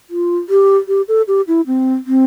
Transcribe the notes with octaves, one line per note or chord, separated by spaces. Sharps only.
F4
G4
G4
A4
G4
E4
C4
C4